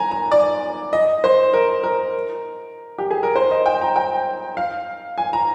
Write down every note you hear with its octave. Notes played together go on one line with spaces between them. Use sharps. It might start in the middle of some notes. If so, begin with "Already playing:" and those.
Already playing: G#5 A#5
A#5
D5
D#5
C5
A#4
A#4
G4
G#4
A#4
C5
D#5
G5
A#5
G5
F5
G#5
A#5